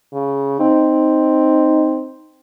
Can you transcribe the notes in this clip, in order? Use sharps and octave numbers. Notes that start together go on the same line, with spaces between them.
C#3
C4 D#4